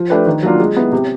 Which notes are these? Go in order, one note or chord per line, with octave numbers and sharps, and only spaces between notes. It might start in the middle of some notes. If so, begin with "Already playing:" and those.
Already playing: F3
A3 D4 G4 B4
D#3
F#3 A#3 D4 F4
G#3
B3 E4
C3